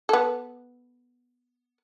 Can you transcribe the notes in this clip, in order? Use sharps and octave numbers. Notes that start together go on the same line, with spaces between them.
B3 A4